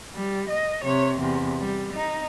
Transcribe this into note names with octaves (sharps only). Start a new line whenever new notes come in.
G3
D#5
C3 C#5
E2 C3
G3
D#4